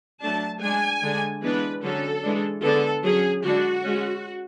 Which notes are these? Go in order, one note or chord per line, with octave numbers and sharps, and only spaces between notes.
F#3 A3 D4 A5
G#3 D4 G#5
D3 G#3 D4
E3 G#3 B3 D4 B4
D3 F#3 C#4 A4
E3 G#3 D4
D3 G#3 B3 D4 A4
F#3 C#4 G#4
D3 G#3 D4 F#4
G#3 C#4